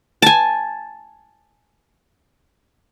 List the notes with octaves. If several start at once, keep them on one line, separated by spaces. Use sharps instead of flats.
G#5 A5